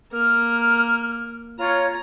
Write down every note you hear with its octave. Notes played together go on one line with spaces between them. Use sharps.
A#3 A#4 F6
F4 C#5 A#5